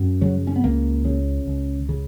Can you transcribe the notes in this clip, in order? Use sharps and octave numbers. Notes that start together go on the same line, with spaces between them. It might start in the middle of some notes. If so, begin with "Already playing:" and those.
Already playing: F#2
C#3 F#3
C#4
B3
C#2 A#3
C#3
C#2
C#3